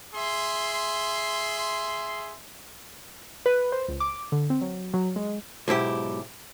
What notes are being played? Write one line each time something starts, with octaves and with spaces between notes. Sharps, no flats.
G#4 E5 C6
B4
C5
C#2
D6
D3
C4
F#3
F#3
G#3
B1 G#2 E4 G4